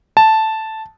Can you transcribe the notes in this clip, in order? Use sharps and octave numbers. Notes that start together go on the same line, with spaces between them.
A5